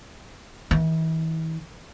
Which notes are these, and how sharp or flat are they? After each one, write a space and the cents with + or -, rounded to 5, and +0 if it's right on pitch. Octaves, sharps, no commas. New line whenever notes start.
E3 -40